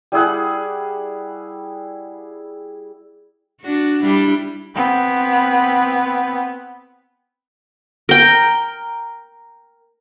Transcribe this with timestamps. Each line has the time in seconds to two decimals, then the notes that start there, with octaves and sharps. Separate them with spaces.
0.12 G3 E4 G#4 F#5
3.61 D4 F#4
4.02 G3 D4 E4
4.75 B3 C4
8.09 A#4 G5